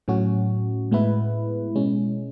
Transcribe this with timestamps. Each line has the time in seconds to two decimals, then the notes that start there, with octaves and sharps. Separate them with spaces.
0.08 A2 F#3 C#4 F#4
0.91 A2 G#3 B3 E4 B4
1.75 B2 G#3 C#4